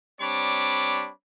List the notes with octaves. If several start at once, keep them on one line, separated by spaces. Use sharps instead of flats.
G3 C4 D4 C#5 B5 D6